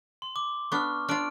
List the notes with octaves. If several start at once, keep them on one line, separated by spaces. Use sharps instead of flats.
C6
D6
B3 D4 C#6 F6
D4 F4 F6 D7